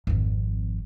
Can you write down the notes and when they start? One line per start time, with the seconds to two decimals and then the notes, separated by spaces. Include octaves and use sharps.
0.07 G#1 F2